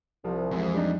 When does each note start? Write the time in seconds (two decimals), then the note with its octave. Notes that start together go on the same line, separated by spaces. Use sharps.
0.24 C2 F3
0.51 F2 E3 G#3 E4
0.74 G3 D4 D#4